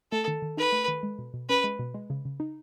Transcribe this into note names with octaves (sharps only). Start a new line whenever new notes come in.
A3 A4
D#3
D#3
D#4 B4
A3
D#3
G#3
B2
B2
C#4 B4
G#3
B2
G#3
C#3
C#3
D#4